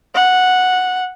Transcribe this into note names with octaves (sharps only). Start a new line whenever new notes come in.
F#5